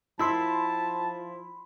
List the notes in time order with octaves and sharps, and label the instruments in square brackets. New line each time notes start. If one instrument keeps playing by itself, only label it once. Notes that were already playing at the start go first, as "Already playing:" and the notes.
[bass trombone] F3 [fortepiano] E4 E6 [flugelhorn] A5 [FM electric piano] B5 C6